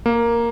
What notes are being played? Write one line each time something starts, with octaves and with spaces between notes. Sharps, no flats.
A#3